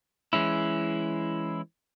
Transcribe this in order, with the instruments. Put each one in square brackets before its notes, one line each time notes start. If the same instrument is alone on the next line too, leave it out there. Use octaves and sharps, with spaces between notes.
[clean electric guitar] E3 G#3 C#4 E4